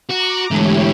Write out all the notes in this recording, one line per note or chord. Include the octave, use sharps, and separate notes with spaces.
F#4 A#5 D6
G#2 D3 E3 G#3 A3 E4 G4 C#5